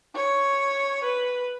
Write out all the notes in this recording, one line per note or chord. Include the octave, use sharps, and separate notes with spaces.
C#5
B4